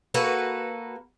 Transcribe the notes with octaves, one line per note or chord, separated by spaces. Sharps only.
A#3 F#4 A4 B4